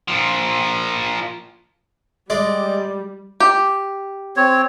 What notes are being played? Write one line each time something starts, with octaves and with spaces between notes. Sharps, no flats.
A#2 F3
G3 G#3 D5
G4
C4 C#5